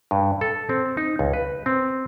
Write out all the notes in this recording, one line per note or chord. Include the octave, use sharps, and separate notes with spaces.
G2
A4
C4
D#4
C#2
B4
C4